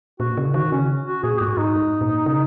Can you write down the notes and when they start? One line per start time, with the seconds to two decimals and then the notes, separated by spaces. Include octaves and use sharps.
0.20 A#2 F#4
0.37 C#3
0.54 D#3 F#4
0.72 C#3 C#4
1.06 F#4
1.23 A#2 G#4
1.41 G#2 F#4
1.57 G#2 D#4
1.75 G#2
2.01 A#2
2.26 C#3